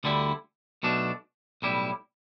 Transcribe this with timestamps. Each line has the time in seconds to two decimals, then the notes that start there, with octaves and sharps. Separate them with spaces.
0.04 D2 D3 G3 E4
0.83 B1 B2 A3 D4
1.62 B1 A2 G3 E4